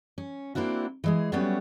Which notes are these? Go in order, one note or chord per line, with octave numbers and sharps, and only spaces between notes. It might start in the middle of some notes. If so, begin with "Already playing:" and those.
C#4
A#3 C4 D4 E4 F#4
E3 G#3 G#4
F#3 G3 A3 B3 C#4